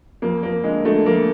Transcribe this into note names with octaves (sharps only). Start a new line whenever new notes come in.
F2 A#3
F2 A#3
D3 G#3
D3 A3
F2 A#3